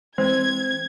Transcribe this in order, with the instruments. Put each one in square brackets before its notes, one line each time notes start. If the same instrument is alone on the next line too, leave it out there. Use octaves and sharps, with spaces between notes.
[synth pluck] E3 G#3 [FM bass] C4 [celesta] C5 [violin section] G#6